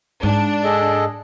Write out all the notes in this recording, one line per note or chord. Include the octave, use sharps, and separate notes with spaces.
G#2 D4
G#4 A4 D#5